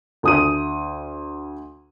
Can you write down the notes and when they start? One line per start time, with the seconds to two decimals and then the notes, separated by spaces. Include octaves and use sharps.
0.23 D2 D#6 D#7